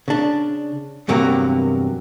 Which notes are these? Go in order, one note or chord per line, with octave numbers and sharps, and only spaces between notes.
C#3 D4
E2 G2 C3 F#3 A#3 G5